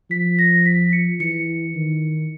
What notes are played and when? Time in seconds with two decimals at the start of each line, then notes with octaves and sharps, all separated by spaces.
0.11 F3 B6
0.39 A#6
0.66 B6
0.93 C#7
1.20 E3 C#7
1.75 D#3